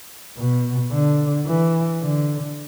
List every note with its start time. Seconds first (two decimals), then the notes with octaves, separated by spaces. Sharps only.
0.37 B2
0.92 D3
1.47 E3
2.01 D3